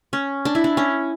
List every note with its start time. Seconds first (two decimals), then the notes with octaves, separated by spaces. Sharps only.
0.13 C#4
0.45 D4
0.55 E4
0.64 D4
0.77 C#4